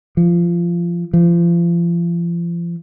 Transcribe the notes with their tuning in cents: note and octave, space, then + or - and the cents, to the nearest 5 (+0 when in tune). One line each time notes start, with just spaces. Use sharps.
F3 -20
F3 -35